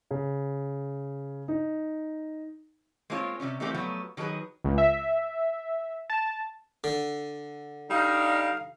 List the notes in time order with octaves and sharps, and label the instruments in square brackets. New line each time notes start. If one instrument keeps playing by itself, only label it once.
[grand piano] C#3
D#4
[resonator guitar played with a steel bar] G#3 A#3 C4 D4 F4 C#5
C3 F#3 G3 C#4
E3 G3 A3 A#3 C4 G4
F3 F#3 A3 B3 G4
D#3 F#3 G#4 A4 B4
[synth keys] C#2
E5
A5
[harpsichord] D3
[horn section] G3 D4 D#4 [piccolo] F5